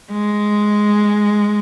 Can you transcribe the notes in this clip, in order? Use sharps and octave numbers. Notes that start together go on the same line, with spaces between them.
G#3